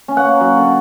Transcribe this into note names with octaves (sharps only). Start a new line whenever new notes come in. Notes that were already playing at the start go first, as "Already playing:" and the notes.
C#4
F#5
A#3
F#3
D3